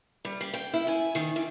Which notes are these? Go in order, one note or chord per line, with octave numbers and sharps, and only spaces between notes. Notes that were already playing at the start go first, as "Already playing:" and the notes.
G3
G3
G5
E4
G#5
D#3
E3